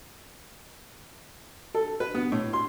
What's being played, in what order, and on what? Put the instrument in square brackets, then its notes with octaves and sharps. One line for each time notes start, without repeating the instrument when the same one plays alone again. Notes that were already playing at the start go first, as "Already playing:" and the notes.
[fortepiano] A4
B4
B3
A2
C6